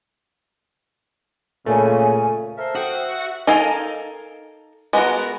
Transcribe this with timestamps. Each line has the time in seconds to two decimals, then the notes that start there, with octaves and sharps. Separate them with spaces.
1.66 A#2 C#3 A3 G#5
2.57 A4 A#4 C5 E5
2.75 F#4 G5 D#6
2.95 E5
3.47 D#4 A4 A#4 F5 G#5
4.93 G#3 B3 F#4 A#4